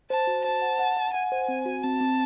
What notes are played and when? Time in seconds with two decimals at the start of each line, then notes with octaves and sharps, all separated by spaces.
0.10 C5 A5
0.27 F#4
0.44 C5 A5
0.62 F#5
0.79 F#5
0.97 F#5
1.14 F#5 G#5
1.32 C5
1.48 C4
1.66 F#4
1.83 C4 A5
2.01 C4